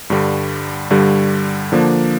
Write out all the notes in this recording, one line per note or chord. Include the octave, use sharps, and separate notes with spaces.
G2 D3 G3
G2 D3 G3
D3 F3 A#3 D4